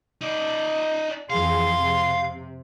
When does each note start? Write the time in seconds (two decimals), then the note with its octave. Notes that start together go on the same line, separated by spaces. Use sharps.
0.21 D#4 D5
1.30 F2 E3 G#4 F5 C6
1.80 C3